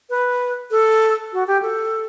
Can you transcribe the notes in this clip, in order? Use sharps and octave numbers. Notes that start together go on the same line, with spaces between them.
B4
A4
F#4
G4
A4